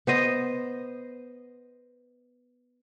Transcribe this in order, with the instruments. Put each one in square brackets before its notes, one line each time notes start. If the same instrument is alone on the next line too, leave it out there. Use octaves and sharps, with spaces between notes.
[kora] B3 C5 D#5